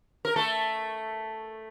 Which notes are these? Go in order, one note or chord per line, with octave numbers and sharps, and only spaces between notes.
A#4
A3 A4